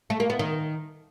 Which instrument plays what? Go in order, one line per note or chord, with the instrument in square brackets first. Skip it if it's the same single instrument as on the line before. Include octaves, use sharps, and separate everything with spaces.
[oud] A3
A#3
B3
D#3